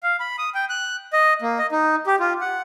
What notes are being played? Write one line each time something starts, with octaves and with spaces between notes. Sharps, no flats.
F5
B5
D#6
G5
F#6
D#5
A#3
D#5
D#4
G4
F4
F#5